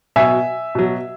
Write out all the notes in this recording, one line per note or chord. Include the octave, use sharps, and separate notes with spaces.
B2 F#3 E5 G#5
B2 F#3